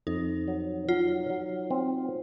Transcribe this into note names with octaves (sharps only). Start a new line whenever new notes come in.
F2 D#4
F#3
F#3 F4
F#3
C4